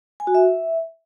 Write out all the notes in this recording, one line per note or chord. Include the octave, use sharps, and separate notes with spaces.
G#5
F#4
E5